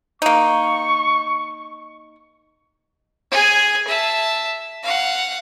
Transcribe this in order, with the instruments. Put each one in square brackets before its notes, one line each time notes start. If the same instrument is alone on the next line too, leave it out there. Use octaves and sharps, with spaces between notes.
[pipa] A#3 D#4 [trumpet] C#6
[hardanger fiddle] G#4 G#5
E5 A5
F5 F#5